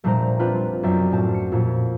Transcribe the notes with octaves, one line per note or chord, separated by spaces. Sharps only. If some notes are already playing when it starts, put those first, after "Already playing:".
F1 A#2 G3 D4 C5 A#5
C4 D4 F4 B4
B1 F#2 D5 E5 G5 C7
A2 C4 A5
C7 C#7
F2 A#2